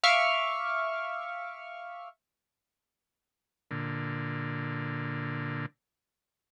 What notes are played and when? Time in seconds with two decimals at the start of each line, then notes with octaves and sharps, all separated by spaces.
0.04 E5 F5 C#6 D6 F6
3.71 A#2 D3